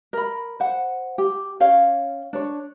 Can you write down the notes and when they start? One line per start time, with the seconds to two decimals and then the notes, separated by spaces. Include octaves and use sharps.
0.13 A#4 B5
0.60 C5 F#5
1.18 G4
1.60 C#4 C#5 F5 G5
2.33 D4 C#5